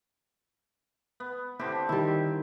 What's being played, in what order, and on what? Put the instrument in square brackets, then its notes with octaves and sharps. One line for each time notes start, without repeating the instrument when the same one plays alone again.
[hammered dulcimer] B3
[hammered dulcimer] D3 C4 G4 [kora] E4
[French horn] D#3 [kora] G3 E4